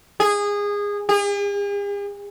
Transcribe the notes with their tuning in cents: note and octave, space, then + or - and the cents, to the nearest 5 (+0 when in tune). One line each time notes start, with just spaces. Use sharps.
G#4 -20
G#4 -45